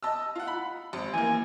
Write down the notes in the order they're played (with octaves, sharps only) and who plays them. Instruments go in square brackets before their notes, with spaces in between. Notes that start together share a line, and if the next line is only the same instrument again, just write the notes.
[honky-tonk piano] D#5 A5 E6
F4 F#5
B5
G#1
[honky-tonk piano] E3 A#3 [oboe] G#5